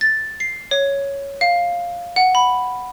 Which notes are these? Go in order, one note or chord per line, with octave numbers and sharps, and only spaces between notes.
A6
C7
C#5
F5
F#5
B5